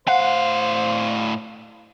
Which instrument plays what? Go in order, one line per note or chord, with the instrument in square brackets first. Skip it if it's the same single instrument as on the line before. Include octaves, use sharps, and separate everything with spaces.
[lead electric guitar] A2 F5 [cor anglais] C5 [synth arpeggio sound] F#5